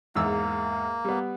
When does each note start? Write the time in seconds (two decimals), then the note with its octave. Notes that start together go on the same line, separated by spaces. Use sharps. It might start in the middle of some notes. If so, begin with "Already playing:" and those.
0.16 E2 G#2 A#3 E6
1.05 G3 B3